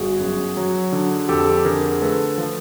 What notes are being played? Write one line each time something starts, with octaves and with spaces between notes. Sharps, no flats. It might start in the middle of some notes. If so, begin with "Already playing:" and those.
Already playing: G1 F#4 G#4
F#2
F#3
D3
F2 G4 A4
D3 G#4 A#4
A3 A4 B4
F3